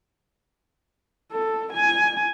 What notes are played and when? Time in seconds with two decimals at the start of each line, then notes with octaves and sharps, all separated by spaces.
1.32 A4
1.73 G#5